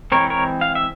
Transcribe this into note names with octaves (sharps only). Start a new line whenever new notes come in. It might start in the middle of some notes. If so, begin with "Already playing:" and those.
E3 G#3 C4 A#4 C#5
A#4 C#5
F5
E5